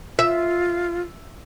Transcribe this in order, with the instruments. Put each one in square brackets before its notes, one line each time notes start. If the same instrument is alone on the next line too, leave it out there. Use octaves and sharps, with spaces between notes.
[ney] F4 [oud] E5